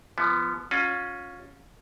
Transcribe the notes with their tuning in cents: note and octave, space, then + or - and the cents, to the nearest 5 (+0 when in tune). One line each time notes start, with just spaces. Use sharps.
F3 -30 B3 +0
C#4 +0 F4 +35